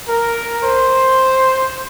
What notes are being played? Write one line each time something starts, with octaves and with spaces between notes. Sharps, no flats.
A#4
C5